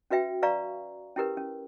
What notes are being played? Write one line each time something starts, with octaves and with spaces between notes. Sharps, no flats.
C#4 F#4 B4 E5 G5
B4 D5 F5 A#5 C#6
C#4 E4 G4 A#4 B4
C#4